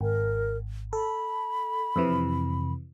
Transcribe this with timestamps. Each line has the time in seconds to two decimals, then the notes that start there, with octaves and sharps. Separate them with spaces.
0.01 G#1 A#4
0.93 A4 B5
1.96 F2 C3 E3